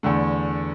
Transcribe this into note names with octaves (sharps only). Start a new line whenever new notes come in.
E2 D3 A3